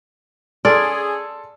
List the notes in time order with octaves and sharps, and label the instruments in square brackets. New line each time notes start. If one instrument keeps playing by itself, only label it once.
[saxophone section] C#4 G#4 [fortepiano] A4 C6 F6 [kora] D5